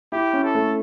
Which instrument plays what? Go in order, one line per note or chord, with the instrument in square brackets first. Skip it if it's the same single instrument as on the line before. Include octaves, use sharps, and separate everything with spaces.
[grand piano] E4 [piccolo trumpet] G4
[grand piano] C#4
[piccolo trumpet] A4
[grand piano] A3